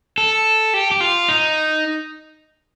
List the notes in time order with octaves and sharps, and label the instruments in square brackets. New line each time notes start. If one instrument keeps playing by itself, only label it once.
[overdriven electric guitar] A4
G4
G4
F4
D#4